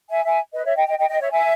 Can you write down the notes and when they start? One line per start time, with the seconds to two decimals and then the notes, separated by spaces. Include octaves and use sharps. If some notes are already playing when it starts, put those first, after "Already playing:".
0.10 E5 G#5
0.25 E5 G#5
0.54 B4 D#5
0.65 C#5 E5
0.77 D#5 G5
0.87 D#5 G5
0.98 D#5 G5
1.09 D#5 G5
1.20 C#5 E5
1.31 E5 G#5